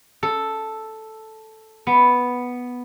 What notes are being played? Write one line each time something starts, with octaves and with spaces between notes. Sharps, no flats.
A4
B3